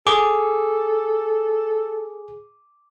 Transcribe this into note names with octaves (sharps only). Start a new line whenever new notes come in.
G#4 A4 D6